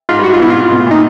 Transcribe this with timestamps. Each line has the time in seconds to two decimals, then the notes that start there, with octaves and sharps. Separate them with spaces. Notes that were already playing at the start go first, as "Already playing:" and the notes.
0.09 G#2 F4
0.19 G2
0.24 F#4
0.30 G#2 F4
0.40 B2 E4
0.50 F4
0.55 C3
0.71 B2
0.80 A2
0.87 A#2 D#4